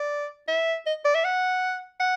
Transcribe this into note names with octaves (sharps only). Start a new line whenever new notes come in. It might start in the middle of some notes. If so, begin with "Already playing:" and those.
Already playing: D5
E5
D#5
D5
E5
F#5
F#5